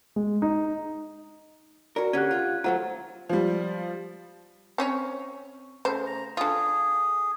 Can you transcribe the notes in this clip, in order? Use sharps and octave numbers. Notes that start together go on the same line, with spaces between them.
G#3
D#4
F#4 A#4 D5
D3 C#4 G4 F#5 F#6 G#6 D#7
F4
F#3 A3 F4 C5 F#5 A#5
F3 G3
C4 C#4 C#5
C#3 A3 C5
A#5
D3 F4 G#4